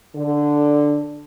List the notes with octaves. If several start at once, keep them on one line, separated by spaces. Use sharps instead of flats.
D3